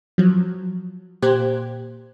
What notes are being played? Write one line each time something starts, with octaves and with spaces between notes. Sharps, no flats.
F3 F#3
A#2 G4 C5 F#6 G#6